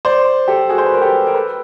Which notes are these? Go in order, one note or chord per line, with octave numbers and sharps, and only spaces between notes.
C5 D5
G4 A4
F#4 G#4
C5
B4
A#4
G4 A4
A#4
A4 B4